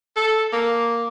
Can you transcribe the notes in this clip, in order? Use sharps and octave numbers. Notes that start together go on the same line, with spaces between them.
A4
A#3